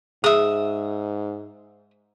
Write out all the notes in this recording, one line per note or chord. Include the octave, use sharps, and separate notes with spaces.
G#2 G#4 E5 D#6